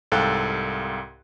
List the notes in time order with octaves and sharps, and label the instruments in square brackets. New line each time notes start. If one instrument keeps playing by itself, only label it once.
[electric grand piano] C2 G#2 A4 F5 G5 F#6